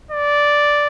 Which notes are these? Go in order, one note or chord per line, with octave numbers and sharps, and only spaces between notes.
D5